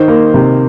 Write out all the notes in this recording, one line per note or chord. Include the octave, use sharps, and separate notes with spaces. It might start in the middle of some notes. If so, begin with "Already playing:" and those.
Already playing: D#3 C5
A#3
C3